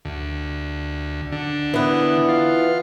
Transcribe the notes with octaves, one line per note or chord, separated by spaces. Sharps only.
D2
D3
E3 B3
F4